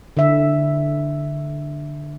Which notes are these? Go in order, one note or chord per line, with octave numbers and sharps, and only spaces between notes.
D3 E5